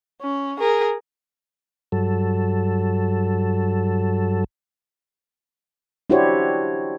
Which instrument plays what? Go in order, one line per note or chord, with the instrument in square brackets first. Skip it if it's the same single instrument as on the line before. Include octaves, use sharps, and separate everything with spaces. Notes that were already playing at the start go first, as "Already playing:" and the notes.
[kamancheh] C#4
G#4 A#4
[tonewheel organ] G2 F#3 A4
[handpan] D4 E4 F#4 G4 C5 C#5